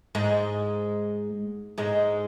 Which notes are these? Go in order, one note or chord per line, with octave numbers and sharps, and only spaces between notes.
G#2 G#3
G#2 G#3